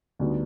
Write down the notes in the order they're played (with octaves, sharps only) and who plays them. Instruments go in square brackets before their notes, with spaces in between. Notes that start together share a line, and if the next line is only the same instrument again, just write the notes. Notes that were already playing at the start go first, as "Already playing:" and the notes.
[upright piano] D2 D3 G3 B3 D#4